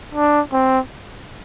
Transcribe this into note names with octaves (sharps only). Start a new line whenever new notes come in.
D4
C4